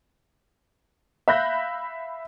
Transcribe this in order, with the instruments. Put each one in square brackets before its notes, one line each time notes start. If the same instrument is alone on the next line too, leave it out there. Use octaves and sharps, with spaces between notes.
[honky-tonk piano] E5 F5 B5 F#6 G6 A#6